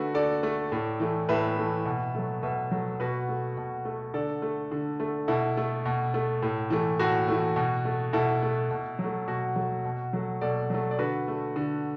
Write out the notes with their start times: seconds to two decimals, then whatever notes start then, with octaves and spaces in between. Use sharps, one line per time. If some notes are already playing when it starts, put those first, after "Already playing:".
Already playing: D3 A3 F#4 B4
0.14 D3 A4 D5
0.43 A3
0.72 A2
1.00 E3 A3
1.29 A2 B4 E5
1.58 E3 A3
1.86 B2
2.15 F#3 A3
2.43 B2 B4 E5
2.71 F#3 A3
3.00 B2 F#4 B4
3.29 A3
3.57 B2
3.85 A3
4.14 D3 A4 D5
4.42 A3
4.71 D3
5.00 A3
5.28 B2 E4 A4
5.57 A3
5.86 B2
6.14 A3
6.43 A2
6.70 E3 A3
6.99 A2 F#4
7.28 E3 A3
7.56 B2
7.85 A3
8.13 B2 E4 A4
8.43 A3
8.71 B2
8.99 F#3
9.04 A3
9.28 B2 F#4
9.56 F#3 A3
9.85 B2
10.13 F#3 A3
10.41 B2 A4 D5
10.70 F#3 A3
10.91 D5
10.99 D3 F#4 B4
11.28 A3
11.56 D3